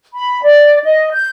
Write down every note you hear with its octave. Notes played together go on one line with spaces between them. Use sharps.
B5
D5
D#5
G6